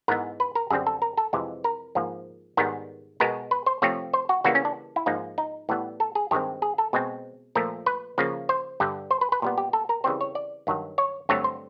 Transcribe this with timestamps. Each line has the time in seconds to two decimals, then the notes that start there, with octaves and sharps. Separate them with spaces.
0.08 G#2 E3 G#3 B3 A#4
0.40 B4
0.55 A#4
0.70 F#2 D3 G3 C4 G#4
0.87 A4
1.02 A#4
1.17 A4
1.33 F2 C3 E3 G#3
1.64 A#4
1.95 G#2 F3 A#3
2.57 G#2 D#3 G3 B3 A#4
3.20 B2 G#3 B3 A#4
3.51 B4
3.66 C5
3.82 C3 F3 A3 C4 C#5
4.13 C5
4.29 F#4
4.44 C#3 E3 G3 A#3 F#4
4.55 C#4
4.65 D4
4.96 E4
5.06 G#2 F3 A#3 D#4
5.38 D#4
5.69 A2 E3 G3 B3
6.00 A4
6.15 G#4
6.31 G2 D#3 G#3 C4 G4
6.62 G#4
6.78 A4
6.93 B2 G#3 C4
7.55 A#2 F3 A3 A#4
7.86 B4
8.18 C#3 F3 A#3
8.49 C5
8.80 G2 D3 G3
9.11 C5
9.21 B4
9.32 B4
9.42 A#2 G3 B3
9.58 G4
9.73 A4
9.89 A#4
10.04 C#3 E3 G3 C4 C5
10.21 C#5
10.35 D5
10.67 G2 D#3 F#3
10.98 C#5
11.29 G2 D3 F#3 A3 C4 C#5
11.44 C5